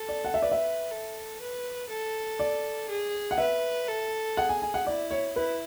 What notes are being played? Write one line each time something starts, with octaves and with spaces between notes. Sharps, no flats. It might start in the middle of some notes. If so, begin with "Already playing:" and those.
Already playing: A4
D5
F#5
E5
B4 D5
E5
A4
B4
A4
D5
G#4
F#5
B4 E5
A4
G#4 F#5
G#5
G#5
F#5
E4 D5
C#5
E4 B4